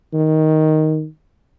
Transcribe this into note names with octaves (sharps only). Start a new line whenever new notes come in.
D#3